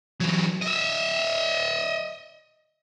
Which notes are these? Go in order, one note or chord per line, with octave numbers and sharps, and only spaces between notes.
E3 F#3
D#5 E5